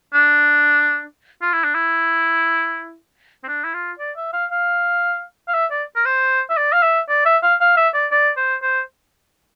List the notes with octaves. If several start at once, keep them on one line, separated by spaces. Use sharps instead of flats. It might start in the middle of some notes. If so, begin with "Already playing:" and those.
D4
F4
E4
D4
E4
C4
D4
E4
F4
D5
E5
F5
F5
F5
E5
D5
A#4
C5
E5
D5
F5
E5
D5
E5
F5
F5
E5
D5
D5
C5
C5